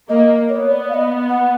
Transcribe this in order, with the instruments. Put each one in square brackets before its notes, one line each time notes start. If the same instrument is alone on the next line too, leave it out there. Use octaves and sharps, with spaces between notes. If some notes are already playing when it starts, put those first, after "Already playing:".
[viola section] A#3 [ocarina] D#5
[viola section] B3 [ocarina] C#5
[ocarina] D5
F5
D#5
F#5